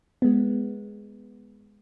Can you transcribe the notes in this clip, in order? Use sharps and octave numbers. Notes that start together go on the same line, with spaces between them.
G#3 B3